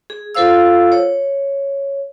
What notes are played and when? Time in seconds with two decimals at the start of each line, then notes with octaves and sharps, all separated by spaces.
0.10 G#4
0.35 F4 A4 C5 F5 E6
0.92 C#5